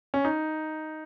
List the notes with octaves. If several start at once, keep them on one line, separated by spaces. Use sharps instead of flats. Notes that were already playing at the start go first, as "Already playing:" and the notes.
C#4
D#4